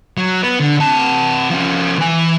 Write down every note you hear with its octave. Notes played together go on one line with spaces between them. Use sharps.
F#3
B3
D3
C3 A5
F3 C#4
E3 G#5